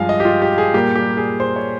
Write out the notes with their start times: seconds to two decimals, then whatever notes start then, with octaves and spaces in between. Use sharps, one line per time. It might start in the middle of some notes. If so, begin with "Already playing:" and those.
Already playing: G2 F3 G#3 F5 G#5
0.09 D#5
0.20 G4
0.25 F4
0.42 G4
0.58 G#4
0.74 A#2 G3 A#3 G4
0.95 G4
1.17 G#4
1.40 C5
1.56 C#5